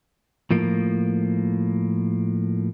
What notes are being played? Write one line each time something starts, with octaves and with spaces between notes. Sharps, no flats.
A2 F3 A#3